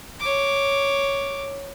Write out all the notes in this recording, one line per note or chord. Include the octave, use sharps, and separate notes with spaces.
C#5 D6